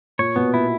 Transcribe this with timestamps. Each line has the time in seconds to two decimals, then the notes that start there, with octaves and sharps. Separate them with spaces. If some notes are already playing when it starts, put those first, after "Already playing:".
0.19 A#2 C#5
0.36 B2 B3
0.53 A#2 E4